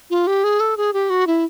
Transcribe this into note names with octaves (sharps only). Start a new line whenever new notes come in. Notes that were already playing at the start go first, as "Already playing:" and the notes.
F4
G4
G#4
A4
G#4
G4
F#4
E4